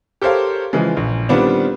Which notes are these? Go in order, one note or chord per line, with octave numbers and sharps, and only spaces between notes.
G4 A4 A#4 C5 C#5 F5
C#3 E3 F3 G#3
A#1
D#3 G3 B3 C4 D4 F4